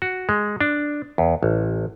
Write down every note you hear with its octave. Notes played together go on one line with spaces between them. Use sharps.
F#4
G#3
D4
E2
A1